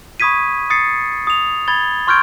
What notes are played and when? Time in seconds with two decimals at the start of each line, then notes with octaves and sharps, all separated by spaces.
0.20 B5 C#6 D#6 G#6 B6 D#7
0.70 D#6 A6 C7 C#7
1.27 D#6 F7
1.68 B5 G#6 A6 G7
2.07 C6 C#6 F6 G6 G#6 D7